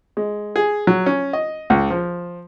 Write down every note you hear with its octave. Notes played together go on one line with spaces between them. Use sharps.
G#3
G#4
F#3
C#4
D#5
C#2
F3